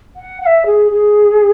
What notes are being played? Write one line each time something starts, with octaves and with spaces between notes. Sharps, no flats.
F#5
F#5
E5
G#4
G#4